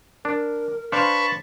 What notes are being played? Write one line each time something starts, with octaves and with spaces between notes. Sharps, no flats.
D4 A#4
D4 B4 C5 F5 A5 B5 C#6